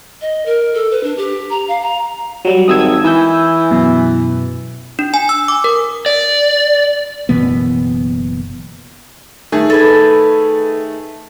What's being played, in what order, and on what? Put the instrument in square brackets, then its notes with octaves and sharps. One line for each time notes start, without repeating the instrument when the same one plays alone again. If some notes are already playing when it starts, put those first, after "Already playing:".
[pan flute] D#5
A#4
A4
B4
D4
G4
A#5
F5
A#5
[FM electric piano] F#3 G3
[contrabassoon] G#1 [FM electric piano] D#6 E6 G#6
[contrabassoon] E3 [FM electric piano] G#5 E6 G6
[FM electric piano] F#2 B2
[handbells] D4
G#5
E6
D6
A#4
[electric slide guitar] D5
[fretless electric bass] F#1 B2 E3 B3
[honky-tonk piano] D#3 A3 G#4
[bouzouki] A4 B4 G#5